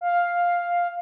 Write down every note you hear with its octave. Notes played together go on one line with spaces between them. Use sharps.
F5